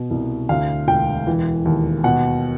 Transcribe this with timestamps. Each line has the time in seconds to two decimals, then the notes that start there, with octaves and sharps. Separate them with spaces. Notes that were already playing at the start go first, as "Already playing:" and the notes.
Already playing: B2
0.11 C2
0.49 D2 F5
0.88 E1 G5
1.27 E3
1.65 D#2
2.04 B2 F#5